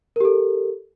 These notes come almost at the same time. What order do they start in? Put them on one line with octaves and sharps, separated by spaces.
A#4 G4 A4